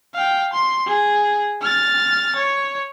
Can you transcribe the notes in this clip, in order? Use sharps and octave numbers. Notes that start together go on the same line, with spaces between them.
F5 G5
C6
G#4
F6 A6
C#5